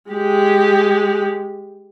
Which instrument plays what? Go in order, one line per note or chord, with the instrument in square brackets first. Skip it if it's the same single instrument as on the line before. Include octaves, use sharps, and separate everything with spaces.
[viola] G#3 G4